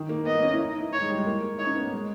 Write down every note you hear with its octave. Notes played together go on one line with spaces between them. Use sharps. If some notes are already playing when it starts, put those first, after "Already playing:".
Already playing: D#3
A#3
B3 D#5
A#3
C#4
E4
D#4
E4
D#4 C#5
G#3
G3
G#3
A#3
D#4 C#5
C#4
B3
A#3
G#3